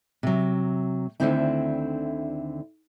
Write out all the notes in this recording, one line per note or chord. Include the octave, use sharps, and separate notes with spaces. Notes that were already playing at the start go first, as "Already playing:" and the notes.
C3 F#3
D2 G#2 D3 D#3 C4 E4